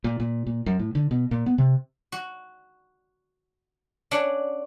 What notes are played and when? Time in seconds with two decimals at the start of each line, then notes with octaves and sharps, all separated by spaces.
0.04 A#2
0.20 A#2
0.47 A#2
0.66 F#2
0.79 A2
0.95 D3
1.11 B2
1.31 A#2
1.46 B3
1.58 C3
2.12 F#4
4.11 C#4 D4 F#5